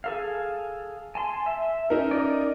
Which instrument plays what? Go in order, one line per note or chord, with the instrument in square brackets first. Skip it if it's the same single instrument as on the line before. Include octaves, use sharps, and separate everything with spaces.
[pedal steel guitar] G#4 A4 F5
G#5 A5 C6
E5
[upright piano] C#4 D#4 A#4
[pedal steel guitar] D5 D#5